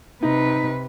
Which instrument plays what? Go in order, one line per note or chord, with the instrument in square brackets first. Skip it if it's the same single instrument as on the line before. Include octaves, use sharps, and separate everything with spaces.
[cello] C3 B4 [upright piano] D#4